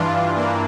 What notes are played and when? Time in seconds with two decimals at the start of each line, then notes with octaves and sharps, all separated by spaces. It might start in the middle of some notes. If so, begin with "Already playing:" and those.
Already playing: G2 E3 D4 F4
0.35 A#3 D4